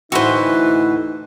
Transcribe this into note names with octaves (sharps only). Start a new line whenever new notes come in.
D2 A2 E3 D#4 F#4 B4 C5